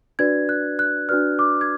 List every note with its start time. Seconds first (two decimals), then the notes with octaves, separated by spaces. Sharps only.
0.19 D4 F#4 B4 D5 G#6
0.49 F#6
0.79 F#6
1.09 D4 F#4 B4 D5 F6
1.39 D6
1.61 G#6